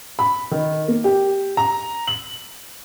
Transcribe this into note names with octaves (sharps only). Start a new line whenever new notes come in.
B5
D#3
A#3
G4
A#5
F#7